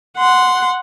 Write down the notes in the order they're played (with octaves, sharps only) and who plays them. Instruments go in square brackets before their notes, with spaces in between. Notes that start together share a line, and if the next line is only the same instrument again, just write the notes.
[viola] F#5 C6